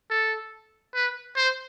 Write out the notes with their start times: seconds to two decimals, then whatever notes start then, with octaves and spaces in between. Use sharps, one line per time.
0.10 A4
0.94 B4
1.36 C5